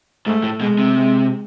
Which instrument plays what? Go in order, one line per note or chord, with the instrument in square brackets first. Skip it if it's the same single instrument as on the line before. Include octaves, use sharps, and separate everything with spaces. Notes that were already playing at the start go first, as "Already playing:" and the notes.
[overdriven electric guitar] G#2 [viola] A3
[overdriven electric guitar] A2
[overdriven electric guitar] B2 [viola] G#3
[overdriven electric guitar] C3
[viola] G#3